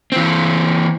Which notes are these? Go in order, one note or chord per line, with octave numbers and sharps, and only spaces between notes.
E3 C4